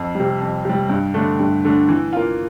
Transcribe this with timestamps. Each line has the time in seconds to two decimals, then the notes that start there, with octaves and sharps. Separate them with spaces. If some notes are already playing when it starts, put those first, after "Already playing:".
Already playing: F2
0.15 C3 G3
0.41 F2
0.65 C3 G3
0.90 G2
1.14 D3 A3 D4
1.39 G2
1.64 D3 A3 D4
1.89 E3
2.13 A#3 F4